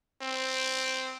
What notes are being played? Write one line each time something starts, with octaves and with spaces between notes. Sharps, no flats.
C4